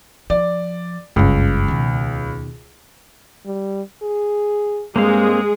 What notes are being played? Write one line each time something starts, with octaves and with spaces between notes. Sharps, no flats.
F3 D5
F#1 C#2 G2
D#2 B2
G3
G#4
G2 G#3 A#3 C4 G#4 F5